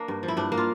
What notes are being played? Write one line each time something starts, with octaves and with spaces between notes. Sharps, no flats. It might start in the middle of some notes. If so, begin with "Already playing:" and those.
Already playing: A#3 D4
G2
F3
E4
G2 D4
A#3
F4